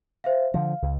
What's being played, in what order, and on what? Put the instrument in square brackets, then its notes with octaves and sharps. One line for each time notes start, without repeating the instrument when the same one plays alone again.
[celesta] C5 E5 F5
[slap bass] D3 F3 [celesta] F5
[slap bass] C#2